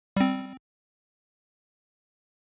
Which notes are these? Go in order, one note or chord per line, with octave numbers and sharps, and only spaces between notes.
G3 C4